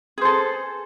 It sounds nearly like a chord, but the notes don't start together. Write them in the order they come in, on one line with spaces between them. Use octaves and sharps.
G#4 C5 A4